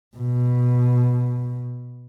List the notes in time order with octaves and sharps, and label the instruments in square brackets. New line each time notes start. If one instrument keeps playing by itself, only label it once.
[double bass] B2